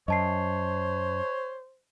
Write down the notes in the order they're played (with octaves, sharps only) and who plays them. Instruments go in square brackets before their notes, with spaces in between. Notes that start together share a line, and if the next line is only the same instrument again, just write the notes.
[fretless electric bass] F#2 [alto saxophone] C5 [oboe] C#5 [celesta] D#5 A5 C7